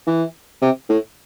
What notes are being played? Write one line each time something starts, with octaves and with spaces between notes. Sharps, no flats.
E3
C3
A2